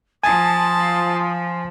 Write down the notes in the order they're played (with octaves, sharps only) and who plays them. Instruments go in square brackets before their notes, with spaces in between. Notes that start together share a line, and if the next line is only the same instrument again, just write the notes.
[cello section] F3 [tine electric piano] G#5 [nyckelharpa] A5 [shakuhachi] D#6